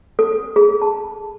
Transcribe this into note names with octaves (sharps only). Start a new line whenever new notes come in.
A4
G#4
A5